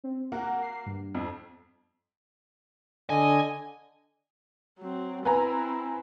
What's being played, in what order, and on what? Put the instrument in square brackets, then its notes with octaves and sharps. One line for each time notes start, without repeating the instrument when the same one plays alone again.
[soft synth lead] C4
[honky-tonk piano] A#3 F#4 [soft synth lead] F#5
[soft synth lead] C7
G2
[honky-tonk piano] F2
[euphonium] D3 [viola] D#5 [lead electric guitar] G#5
[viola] F#3 C4
[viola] C4 E4 [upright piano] B4 G#5 A#5